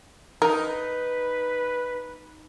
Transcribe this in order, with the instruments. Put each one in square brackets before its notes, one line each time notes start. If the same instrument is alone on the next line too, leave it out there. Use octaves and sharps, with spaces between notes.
[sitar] D#4 [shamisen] A#4 [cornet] B4